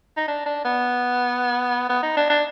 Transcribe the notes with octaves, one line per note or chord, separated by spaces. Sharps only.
D#4
D4
D4
B3
B3
D#4
D4
D4